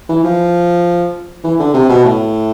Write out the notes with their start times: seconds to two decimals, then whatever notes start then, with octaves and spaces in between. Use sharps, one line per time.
0.09 E3
0.24 F3
1.44 E3
1.59 D3
1.74 C3
1.89 B2
2.05 A2